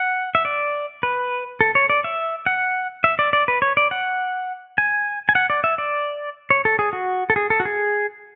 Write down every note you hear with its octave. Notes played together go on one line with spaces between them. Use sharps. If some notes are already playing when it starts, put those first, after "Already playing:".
Already playing: F#5
E5
D5
B4
A4
C#5
D5
E5
F#5
E5
D5
D5
B4
C#5
D5
F#5
G#5
G#5
F#5
D5
E5
D5
C#5
A4
G#4
F#4
A4
G#4
A4
F#4
G#4